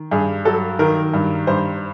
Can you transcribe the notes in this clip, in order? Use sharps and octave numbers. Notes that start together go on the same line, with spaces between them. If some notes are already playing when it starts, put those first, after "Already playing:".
Already playing: D#3
G2 G#4
F#3 A4
D#3 A#4
G2
G2 C5